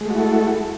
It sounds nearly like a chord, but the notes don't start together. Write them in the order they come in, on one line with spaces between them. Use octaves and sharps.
G#3 A3 F#4 E4 A4